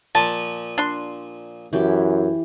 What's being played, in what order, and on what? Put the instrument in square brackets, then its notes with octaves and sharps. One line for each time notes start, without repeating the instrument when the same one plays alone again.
[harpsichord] A#2 F3 [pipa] A5
[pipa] D4 C6
[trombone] F#2 [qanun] E3 G4